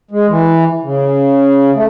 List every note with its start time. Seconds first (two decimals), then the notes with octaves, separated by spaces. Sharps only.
0.11 G#3
0.29 E3
0.83 C#3
1.76 A3